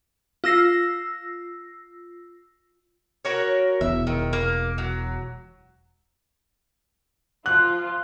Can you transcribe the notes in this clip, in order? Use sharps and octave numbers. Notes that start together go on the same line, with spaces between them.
F4 E6 A#6 C7
F#4 A#4 C#5
E1 E2 E5
D#3
A#3
F#3
F3 F4 F#6